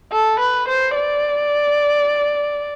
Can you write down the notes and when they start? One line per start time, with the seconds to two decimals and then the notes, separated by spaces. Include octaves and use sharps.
0.12 A4
0.39 B4
0.68 C5
0.96 D5